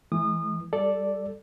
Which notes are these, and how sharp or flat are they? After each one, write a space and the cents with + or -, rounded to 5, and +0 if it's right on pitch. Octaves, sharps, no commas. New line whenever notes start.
E3 +0 G#3 +45 D#6 -30
G3 +0 A4 +0 D5 +0